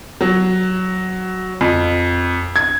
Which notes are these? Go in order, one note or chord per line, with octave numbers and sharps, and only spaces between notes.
F#3
F2
G#6